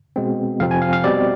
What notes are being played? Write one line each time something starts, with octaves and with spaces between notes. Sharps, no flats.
B2 G#3 C4
F2 C3 F3 C4 F5
G#5
F5
F5
B2 G3 C4 D5